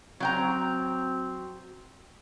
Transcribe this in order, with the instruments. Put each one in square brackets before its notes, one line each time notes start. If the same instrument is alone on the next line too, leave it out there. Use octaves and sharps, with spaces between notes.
[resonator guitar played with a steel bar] F#3 G5 A#5 [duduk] C4